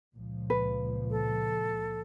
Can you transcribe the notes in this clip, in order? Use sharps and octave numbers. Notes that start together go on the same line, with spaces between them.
C#2 A#2 F3
B4
A4